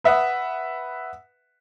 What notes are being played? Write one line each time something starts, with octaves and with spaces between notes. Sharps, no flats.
B4 E5 F#5 D#6